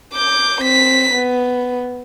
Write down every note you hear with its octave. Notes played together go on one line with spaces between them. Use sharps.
D6 G6
C4 B6
B3